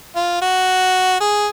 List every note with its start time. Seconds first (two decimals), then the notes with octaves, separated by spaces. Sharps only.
0.16 F4
0.42 F#4
1.20 G#4